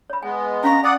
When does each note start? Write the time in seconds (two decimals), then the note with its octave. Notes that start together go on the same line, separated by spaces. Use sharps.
0.10 C#5 B5
0.23 G#3 B3 G#5
0.64 C#4 F5 A#5 C#6
0.84 D5 F#5 G#5 D#6